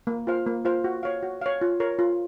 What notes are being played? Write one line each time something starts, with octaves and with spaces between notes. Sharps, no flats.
A#3
F4 C5 F5
A#3
F4 C5 F5
F#4
C#5 F5
F#4
C#5 F5
F4
A#4 C#5
F4